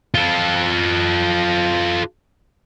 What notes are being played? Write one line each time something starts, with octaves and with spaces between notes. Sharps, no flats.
F4 A4